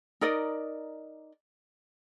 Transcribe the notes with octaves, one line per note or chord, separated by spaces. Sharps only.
D#4 A#4 D5 D#5